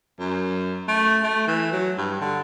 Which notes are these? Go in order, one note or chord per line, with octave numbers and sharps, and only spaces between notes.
F#2
A3
A3
E3
F#3
G2
D3